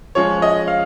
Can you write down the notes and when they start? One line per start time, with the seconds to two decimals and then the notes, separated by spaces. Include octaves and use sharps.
0.15 F3 G#3 C#4 C#5
0.42 D#5
0.68 F5